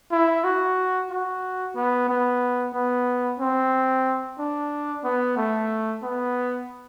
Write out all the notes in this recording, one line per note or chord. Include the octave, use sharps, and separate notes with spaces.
E4
F#4
F#4
B3
B3
B3
C4
D4
B3
A3
B3